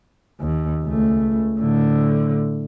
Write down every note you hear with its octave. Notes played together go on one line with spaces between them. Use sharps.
D#2
C#2 A3
A2 D3